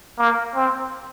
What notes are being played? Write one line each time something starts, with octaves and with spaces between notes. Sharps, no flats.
A#3
C4